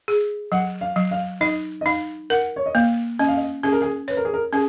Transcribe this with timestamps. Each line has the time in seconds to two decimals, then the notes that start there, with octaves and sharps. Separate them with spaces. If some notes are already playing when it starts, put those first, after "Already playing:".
0.08 G#4
0.52 F#3 F#5
0.81 F5
0.96 F#3
1.11 F5
1.41 D#4 D#5
1.81 D#5
1.86 D#4 F5
2.30 A#4 F#5
2.56 C#5
2.66 D#5
2.75 A#3 F5
3.19 C#4 D#5
3.28 F5
3.37 D#5
3.64 C#4 G#4
3.72 A#4
3.82 G#4
4.08 B4 C#5
4.17 A#4
4.25 G#4
4.33 A#4
4.53 C#4 G#4